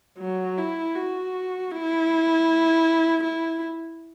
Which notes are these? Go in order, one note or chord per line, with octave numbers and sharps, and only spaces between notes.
F#3
E4
F#4
E4
E4